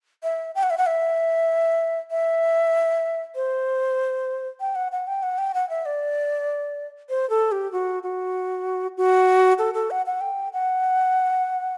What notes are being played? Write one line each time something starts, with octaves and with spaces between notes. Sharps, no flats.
E5
G5
F#5
E5
F#5
E5
E5
C5
G5
F#5
F#5
G5
F#5
G5
F#5
E5
D5
C5
A4
G4
F#4
F#4
F#4
A4
A4
F#5
F#5
G5
F#5